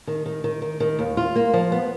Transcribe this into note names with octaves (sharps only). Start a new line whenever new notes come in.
D#3
D#3
D#3
D#3
D#3
D#2
F4
A#3
F3
B3